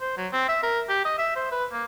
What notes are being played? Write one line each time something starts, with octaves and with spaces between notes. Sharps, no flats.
C5
F#3
C4
E5
A#4
G4
D#5
E5
C5
B4
A#3